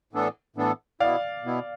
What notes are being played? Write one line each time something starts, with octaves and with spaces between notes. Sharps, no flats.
A2 E3 B3 D4 A4
A2 E3 B3 D4 A4
B2 B3 E4 D5 F5
B2 B3 E4